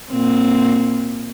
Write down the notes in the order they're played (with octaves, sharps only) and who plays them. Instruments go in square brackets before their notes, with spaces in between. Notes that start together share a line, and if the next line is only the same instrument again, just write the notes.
[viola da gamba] A#2 C4